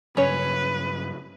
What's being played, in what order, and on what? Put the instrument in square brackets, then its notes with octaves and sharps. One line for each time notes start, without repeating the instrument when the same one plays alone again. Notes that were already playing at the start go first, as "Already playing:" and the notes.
[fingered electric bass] G2 C#3 F#3 [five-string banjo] C#4 C#5 [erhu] B4